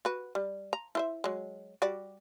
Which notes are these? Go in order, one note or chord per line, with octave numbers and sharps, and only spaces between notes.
F#4 B4
G3
A#5
E4 C5 E5
F#3 G#3
G3 F#4 D5